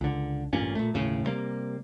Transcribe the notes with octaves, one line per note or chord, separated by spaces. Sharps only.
C#2 D3
A1 G2 A#2 C#4
A#2 A3
G1 D#2 A2 C#3
C3 G3 A#3